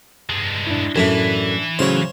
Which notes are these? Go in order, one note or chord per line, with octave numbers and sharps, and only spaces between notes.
G2 G#3
D4 E4
F#2 A2 E3 A3
A2 C#3 F#3 C5 C#5